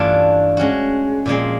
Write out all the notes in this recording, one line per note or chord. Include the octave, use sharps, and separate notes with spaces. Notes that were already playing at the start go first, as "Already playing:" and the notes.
Already playing: G2 E3 A3 D4 F4
G#3 C#4 F#4
A#2 F3 G#3 C4